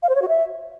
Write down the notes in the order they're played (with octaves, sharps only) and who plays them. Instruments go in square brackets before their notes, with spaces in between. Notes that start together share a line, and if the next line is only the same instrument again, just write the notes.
[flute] F5
C5
C#5
F#4
E5